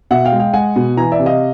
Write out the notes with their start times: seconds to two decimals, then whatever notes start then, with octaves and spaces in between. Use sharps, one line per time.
0.11 B2 E5 F#5
0.25 F5 G5
0.32 G#3
0.40 F5 G5
0.53 G#3 F#5 G#5
0.76 B2
0.97 E3 G#5 A#5
1.12 D5 E5
1.20 C3
1.26 D#5 F5